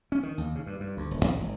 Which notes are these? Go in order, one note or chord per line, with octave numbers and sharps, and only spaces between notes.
C#4
D#3
D#2
C#3
G2
G2
D2
D#1
C2
G#1